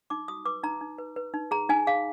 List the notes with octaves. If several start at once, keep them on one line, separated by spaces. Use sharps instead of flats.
D#4 D6
F#4 D#6
B4 D6
D#4 A#5
D#4
B4
B4
D#4
G#4 A#5
D#4 G#5
G#4 F5